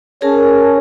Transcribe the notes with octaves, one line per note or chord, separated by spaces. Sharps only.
C#4 G#4 A#4 A5